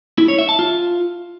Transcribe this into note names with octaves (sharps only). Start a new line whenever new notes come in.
E4
C#5
E5
A5
F4